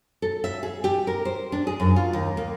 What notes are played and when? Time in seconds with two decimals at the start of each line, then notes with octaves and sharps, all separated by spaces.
0.22 A4
0.44 E5
0.63 G#4
0.84 G4
1.07 A#4
1.25 C5
1.52 D4
1.67 G#4
1.80 F#2
1.96 F4
2.13 D#2
2.37 A#3